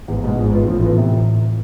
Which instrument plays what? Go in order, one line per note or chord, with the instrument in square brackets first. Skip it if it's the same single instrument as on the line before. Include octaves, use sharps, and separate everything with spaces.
[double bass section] G#1 G#2 [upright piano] E2
[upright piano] B2 G#3
[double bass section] G#1 G#2 [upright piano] F3
[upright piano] B3 F4
[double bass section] A1 A2 [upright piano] F3
[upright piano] B3 F4
C3